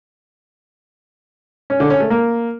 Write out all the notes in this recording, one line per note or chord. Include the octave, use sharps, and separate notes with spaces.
C#4
D3
C#4
A3
A#3